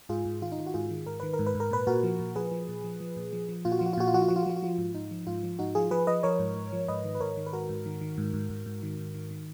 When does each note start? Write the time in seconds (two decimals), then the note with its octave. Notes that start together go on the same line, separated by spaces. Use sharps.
0.09 G#2 F4 G#4
0.25 G#2
0.42 D#3 F4
0.52 D#4
0.58 D#3 F4
0.66 F#4
0.74 G#2 F4 G#4
0.90 D#3
1.06 G#2 A#4
1.20 D#3 B4
1.33 A#4
1.39 G#2
1.46 B4
1.55 G#2
1.60 A#4
1.71 A#2 B4
1.87 A#2 F#4 A#4
2.03 F3
2.19 A#2
2.36 F3 G#4 B4
2.51 F3
2.68 A#2
2.84 F3
3.00 F3
3.16 A#2
3.32 F3
3.49 F3
3.65 A#2 F4
3.72 F#4
3.79 F3 F4
3.86 F#4
3.93 F4
3.97 A#2 F#4
4.07 F4
4.14 F3 F#4
4.22 F4
4.28 F3 F#4
4.36 F4
4.43 F#4
4.46 F3 F4
4.56 F#4
4.63 F3 F4
4.78 G#2
4.94 G#2 D#4
5.11 F3
5.27 G#2 F4
5.43 F3
5.59 G#2 D#4 F#4
5.75 F3 F4 G#4
5.91 F3 G#4 B4
6.07 F3 B4 D#5
6.23 F3 A#4 C#5
6.39 G#2
6.56 G#2
6.72 F3
6.88 G#2 B4 D#5
7.04 D#3
7.15 B4
7.20 G#2 A#4 C#5
7.37 D#3
7.47 B4
7.53 G#2 F#4 A#4
7.69 G#2
7.86 D#3
8.01 D#3
8.18 G#2
8.33 G#2
8.50 G#2
8.66 G#2
8.83 D#3
8.98 G#2
9.14 D#3
9.31 D#3